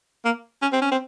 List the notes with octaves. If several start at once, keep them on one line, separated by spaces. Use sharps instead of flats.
A#3
C#4
C4
C#4
C4